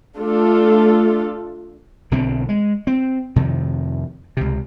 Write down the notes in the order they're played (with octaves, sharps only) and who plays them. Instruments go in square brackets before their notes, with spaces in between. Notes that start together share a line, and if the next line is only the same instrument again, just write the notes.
[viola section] A3 D4 F4 A4
[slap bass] B1 D3 F#3 C4
G#3
C4
F2 C3 D#3
C#2 C3